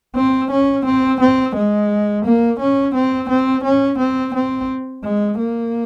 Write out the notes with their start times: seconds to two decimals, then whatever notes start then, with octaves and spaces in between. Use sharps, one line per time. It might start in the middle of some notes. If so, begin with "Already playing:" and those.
0.16 C4
0.51 C#4
0.86 C4
1.21 C4
1.56 G#3
2.25 A#3
2.60 C#4
2.95 C4
3.30 C4
3.64 C#4
3.99 C4
4.35 C4
5.04 G#3
5.39 A#3